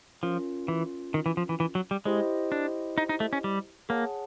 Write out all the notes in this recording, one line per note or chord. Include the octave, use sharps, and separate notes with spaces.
F3 C#4 F4 A#4
E3
D#3
E3
F3
E3
E3
F#3
G3
G#3 E4 G4 C5 D#5
D4
D#4
D#4
A3
C#4
G3
A#3 G#4 C#5 F#5 A5